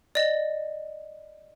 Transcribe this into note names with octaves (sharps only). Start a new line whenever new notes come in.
D5 D#5